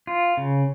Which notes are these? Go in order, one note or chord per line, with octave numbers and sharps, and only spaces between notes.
F4
C#3